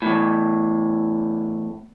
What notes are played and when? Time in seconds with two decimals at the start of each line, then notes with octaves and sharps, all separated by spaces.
0.02 E2 A2